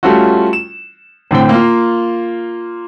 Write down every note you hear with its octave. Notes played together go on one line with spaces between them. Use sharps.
G3 A3 C#4 F4 F#4
E7
A2 D3 C4 G5
A#3 F4